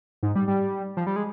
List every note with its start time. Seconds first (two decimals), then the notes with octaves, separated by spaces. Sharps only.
0.23 G#2
0.35 G3
0.48 G3
0.97 F3
1.07 G3
1.16 G#3